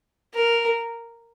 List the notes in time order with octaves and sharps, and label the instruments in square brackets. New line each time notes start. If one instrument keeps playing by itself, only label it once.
[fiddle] A#4